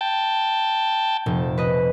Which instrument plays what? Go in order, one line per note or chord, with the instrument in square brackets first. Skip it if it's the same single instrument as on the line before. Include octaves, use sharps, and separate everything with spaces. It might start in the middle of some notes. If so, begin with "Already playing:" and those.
[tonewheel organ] G5 A5
[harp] F1 [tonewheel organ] A#2
[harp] B4 D#5